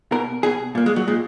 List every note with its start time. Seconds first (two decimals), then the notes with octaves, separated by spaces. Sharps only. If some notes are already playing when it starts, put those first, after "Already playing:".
0.12 B2 A#4
0.43 B2 G#4
0.75 A#2 A#3
0.86 G#3
0.96 F#3
1.08 A#2 G#3